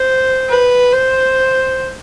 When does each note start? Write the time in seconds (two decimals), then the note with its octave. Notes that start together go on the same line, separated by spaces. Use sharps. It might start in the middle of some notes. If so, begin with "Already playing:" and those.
Already playing: C5
0.49 B4
0.92 C5